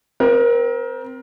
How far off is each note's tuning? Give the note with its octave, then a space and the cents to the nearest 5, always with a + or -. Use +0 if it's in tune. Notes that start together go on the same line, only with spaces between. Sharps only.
C4 -15 A#4 +25